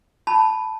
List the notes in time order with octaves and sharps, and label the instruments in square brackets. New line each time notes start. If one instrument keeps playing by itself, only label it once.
[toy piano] A5 B5